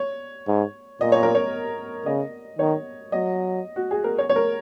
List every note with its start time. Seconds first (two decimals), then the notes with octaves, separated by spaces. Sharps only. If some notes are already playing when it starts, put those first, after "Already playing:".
Already playing: C#5
0.47 G#2
1.01 A#2 D#5
1.12 C#5
1.23 A#4
1.35 C#5
2.06 C#3 D#5
2.59 D#3 C#5
3.12 F#3 D#5
3.76 F#4
3.91 G#4
4.04 A#4
4.18 C#5
4.29 C#5
4.36 A#4